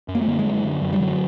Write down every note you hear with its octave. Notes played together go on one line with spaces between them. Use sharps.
F#2
A#3
A3
D3 A#3
G#3
F#2
D3
F#2
G3
D3 F#3